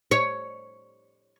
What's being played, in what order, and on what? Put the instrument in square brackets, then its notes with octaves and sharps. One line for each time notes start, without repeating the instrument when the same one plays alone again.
[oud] C#5